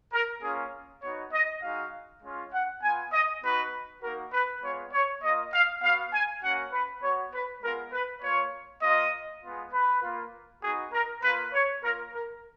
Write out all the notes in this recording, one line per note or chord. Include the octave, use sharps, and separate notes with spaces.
A#4
A#3 C#4 F4 G#4
B3 D#4 F#4 C#5
D#5
G#3 D#4 F#4 F5
G#3 C#4 F4
F#5
B3 F4 G#5
D#5
B3 D#4 F#4 B4
A#3 D#4 F#4 A#4
B4
G#3 B3 F4 C#5
C#5
A#3 F4 D#5
F5
B3 F#4 F5
G#5
A#3 C#4 F#4 F#5
B4
B3 F#4 C#5
B4
G#3 B3 F4 A#4
B4
A#3 F4 C#5
A#3 F4 D#5
G#3 B3 F4
B4
A#3 F4
B3 D#4 F#4 G#4
A#4
A#3 F4 B4
C#5
A#3 F4 A#4
A#4